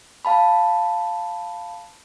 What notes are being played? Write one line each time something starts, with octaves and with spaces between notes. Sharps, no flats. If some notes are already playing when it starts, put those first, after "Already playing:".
F5 A5 B5